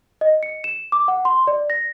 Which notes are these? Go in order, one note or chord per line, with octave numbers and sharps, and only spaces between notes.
D#5
C#7
E7
D6
F#5
C6
D5
A#6